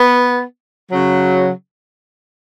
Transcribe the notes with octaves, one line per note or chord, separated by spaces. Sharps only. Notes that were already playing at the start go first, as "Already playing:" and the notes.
Already playing: B3
C#3 F#3